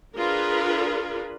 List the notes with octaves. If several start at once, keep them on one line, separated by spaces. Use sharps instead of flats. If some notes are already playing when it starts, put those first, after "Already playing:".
D4 F4 G#4 A#4 B4